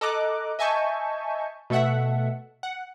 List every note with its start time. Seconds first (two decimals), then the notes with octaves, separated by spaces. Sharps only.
0.01 A4 D#5 A#5 D6 F#6
0.59 D#5 E5 G#5 A5 C#6 G6
1.70 B2 A3 A4 E5 F#5
2.63 F#5